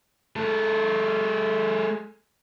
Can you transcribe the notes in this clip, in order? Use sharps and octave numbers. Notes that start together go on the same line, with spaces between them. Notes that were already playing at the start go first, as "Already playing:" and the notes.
G#3 A4